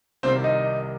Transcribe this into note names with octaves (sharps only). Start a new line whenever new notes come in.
C2 C3 D#3 G3 C4 C5
D#4 D#5